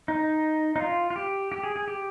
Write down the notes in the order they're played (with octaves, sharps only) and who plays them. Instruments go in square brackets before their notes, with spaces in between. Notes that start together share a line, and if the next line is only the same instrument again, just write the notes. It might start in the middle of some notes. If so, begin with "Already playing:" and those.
[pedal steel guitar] D#4
D#4
F4
F4
G4
G4
G#4
G#4
G4